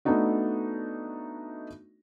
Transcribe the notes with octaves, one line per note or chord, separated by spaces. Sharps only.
A3 B3 D4 D#4 F#4